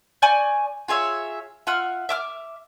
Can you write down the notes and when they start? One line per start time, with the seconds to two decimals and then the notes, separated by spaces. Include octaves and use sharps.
0.22 D5 G#5 C#6 G6
0.88 F4 G#4 C#5 E5
1.67 F4 E5 F#5 F6
2.09 E5 D6 F6